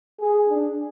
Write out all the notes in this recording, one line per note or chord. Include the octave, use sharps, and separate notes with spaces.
G#4
D4